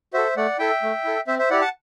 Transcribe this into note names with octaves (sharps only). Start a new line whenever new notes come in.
F#4 A4 C5 E5
A3 D5 F#5
E4 A4 E5 G5
A3
E4 A4
C4 C5 E5
C5 E5
E4 G4 D5 F#5
F#5 A5